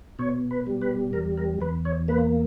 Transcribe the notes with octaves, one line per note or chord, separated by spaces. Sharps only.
B2 C#5
B4
G3
B4
E2 A#4
A#4
E2 B4
C#5
A#3 B4